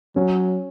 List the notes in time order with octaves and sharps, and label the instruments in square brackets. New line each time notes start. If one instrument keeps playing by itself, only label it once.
[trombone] F#3 [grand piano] C#4